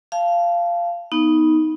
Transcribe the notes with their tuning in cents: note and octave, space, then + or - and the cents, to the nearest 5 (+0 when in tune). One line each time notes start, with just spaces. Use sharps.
F5 -20 A5 -15
B3 -10 D#4 +10